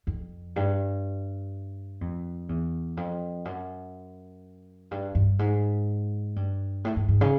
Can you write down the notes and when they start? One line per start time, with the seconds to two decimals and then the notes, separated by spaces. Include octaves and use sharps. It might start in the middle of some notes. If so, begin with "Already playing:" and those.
0.07 F2
0.56 G2
2.01 F2
2.49 E2
2.97 F2
3.45 F#2
4.91 G2
5.15 G2
5.39 G#2
6.36 G2
6.85 A2
6.96 G#2
7.08 G#2
7.21 C#3